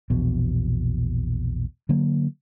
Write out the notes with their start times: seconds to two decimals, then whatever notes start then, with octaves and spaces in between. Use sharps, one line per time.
0.10 A#1 E2 B2
1.89 D3 F#3 A#3